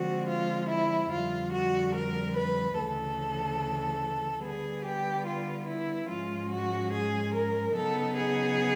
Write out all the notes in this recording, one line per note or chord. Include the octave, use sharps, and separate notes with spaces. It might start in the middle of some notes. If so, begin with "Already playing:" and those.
Already playing: D3 F3 G#3 C4 F#4
F4
E4
F2 D3 G3 F4
F#4
A#4
B4
D2 C#3 E3 A4
D3 G3 B3 G#4
G4
F4
E4
G#2 F3 G#3 C#4 F4
F#4
G#4
A#4
C#3 F#3 B3 D#4 A4
G#4